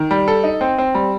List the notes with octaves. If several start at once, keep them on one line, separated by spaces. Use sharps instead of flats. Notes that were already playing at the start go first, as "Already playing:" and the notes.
Already playing: D#3
G3
A4
D#4
C4
C4
G3